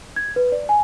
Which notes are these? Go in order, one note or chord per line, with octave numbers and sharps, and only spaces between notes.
G#6
B4
D5
G#5